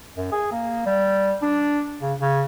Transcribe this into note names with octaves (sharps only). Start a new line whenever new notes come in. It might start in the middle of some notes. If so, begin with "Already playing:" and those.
F#2
G#4
A#3
G3
D4
C#3
C#3